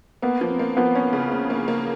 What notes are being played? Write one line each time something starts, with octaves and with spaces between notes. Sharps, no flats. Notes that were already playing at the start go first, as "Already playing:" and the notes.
A#3 B3
F3 B3
C4
A#3
F3 B3
C#4
C#3
A#3
A#3
A#3